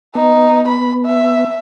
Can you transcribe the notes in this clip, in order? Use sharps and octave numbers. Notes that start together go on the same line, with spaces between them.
B3 D#4
B5
E5